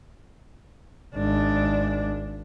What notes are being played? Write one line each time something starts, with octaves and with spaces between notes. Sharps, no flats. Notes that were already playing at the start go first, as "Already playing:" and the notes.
G#1 D4